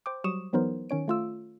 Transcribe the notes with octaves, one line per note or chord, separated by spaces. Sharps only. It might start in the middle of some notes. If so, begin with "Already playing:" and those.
C5 G5 D6
F#3 G3 C#6 D#6 E7
E3 F#3 B3 D#4 A#4 C5
D#3 C#4 C#5 D7
A3 F4 E6